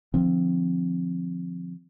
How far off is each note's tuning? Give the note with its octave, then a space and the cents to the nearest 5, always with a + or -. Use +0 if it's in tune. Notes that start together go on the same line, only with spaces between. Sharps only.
D3 +40 F3 +0 C4 +0